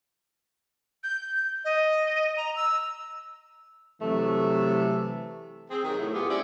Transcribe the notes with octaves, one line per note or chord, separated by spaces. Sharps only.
G6
D#5
A#5
E6
C3 E3 F#3 A3
C4 G#4
C3 D#3 F#3 F#4 G#4
A2
A2 G3 B3 F4 G4 G#4
C4 C#4 E4 D5